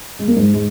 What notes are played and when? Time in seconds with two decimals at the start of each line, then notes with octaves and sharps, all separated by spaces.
0.19 G#3
0.28 A#3
0.36 G#2 G#3
0.54 G#3